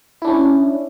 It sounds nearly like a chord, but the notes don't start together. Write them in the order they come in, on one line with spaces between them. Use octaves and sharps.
E4 D4 C#4